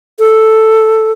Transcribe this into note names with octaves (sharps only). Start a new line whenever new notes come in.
A4